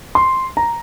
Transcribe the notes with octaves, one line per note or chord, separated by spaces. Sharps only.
C6
A#5